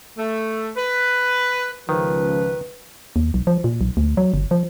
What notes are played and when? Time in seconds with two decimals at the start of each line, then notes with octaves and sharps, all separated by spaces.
0.17 A3
0.77 B4
1.89 C#2 D#3 F3 B4
3.16 D#2
3.34 B1
3.47 F3
3.64 A#2
3.81 B1
3.97 D2
4.17 F#3
4.34 G1
4.51 F3